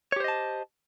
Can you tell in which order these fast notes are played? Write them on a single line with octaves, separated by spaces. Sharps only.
C#5 G4 C5 D#5 A5